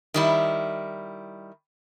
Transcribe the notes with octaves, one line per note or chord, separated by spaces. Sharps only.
D#3 G3 E4